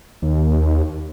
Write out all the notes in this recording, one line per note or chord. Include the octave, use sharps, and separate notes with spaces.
D#2